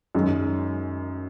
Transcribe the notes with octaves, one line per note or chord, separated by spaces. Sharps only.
F#2 D#3 G#3